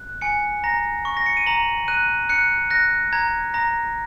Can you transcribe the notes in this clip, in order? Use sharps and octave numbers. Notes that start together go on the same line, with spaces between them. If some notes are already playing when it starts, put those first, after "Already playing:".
Already playing: F#6
G#5 C#7
A#5 A#6
C#6
A#6
C#7
D#7
A#5 F#7
F#6 D#7
F#6 C#7
F#6 A#6
A#5 G#6
A#5 A#6